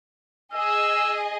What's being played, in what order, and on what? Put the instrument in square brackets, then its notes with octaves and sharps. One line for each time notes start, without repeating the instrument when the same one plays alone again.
[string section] G#4 D#5 [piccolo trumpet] E6